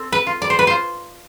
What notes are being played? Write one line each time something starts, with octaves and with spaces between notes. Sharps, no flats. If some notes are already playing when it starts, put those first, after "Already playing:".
Already playing: C4 A4
B4
F4
D5
C5
B4
F4 C5